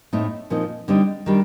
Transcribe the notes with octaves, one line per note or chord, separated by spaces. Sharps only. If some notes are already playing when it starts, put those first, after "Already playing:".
A2 A3 C4 D#4
A#2 F3 C4 D#4
D3 G3 C4 D#4
D#3 G3 D4